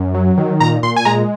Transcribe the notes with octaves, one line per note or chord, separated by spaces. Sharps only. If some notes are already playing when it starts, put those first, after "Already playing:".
Already playing: F#2
F#3
D#3
A#2 A#5
A#2 C6
G#5
G#3 A#5